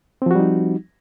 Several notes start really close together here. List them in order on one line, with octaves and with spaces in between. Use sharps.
C4 F3 F#4 G3 D#4